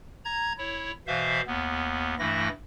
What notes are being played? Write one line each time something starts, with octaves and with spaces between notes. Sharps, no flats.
A#5 G#6
E4 C#5
B2 E3 C5 E5 F5
D#2 B3
G2 E3 A3 E4 A#6